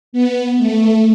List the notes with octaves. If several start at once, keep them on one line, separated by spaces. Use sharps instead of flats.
B3
A3